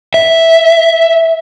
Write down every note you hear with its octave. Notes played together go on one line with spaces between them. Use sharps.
E5